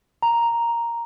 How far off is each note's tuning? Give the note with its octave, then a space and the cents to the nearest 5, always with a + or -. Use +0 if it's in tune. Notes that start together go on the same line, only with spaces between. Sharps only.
A#5 +0